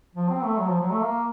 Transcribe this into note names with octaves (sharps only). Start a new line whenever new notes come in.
F3
C4
A3
F#3
F3
F#3
A3
A#3